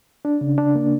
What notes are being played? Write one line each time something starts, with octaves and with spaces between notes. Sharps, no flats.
D4
C#3
D4
A#3